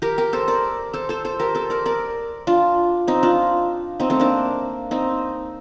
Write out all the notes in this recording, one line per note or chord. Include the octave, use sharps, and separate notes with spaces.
G4 A#4
G4 A#4
A4 C5
A#4 D5
A4 C5
A4 C5
A4 C5
G4 A#4
A4 C5
A#4 D5
A#4 D5
D4 F4
C4 D#4
D4 F4
C4 D#4
A3 C4
A#3 D4
C4 D#4